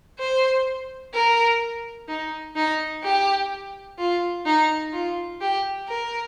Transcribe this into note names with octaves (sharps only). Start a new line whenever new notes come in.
C5
A#4
D#4
D#4
G4
F4
D#4
F4
G4
A#4